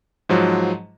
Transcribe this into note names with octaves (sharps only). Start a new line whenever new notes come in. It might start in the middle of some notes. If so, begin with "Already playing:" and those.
G#2 F3 F#3